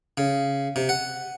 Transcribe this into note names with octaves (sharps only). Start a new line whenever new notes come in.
C#3
C3
F#5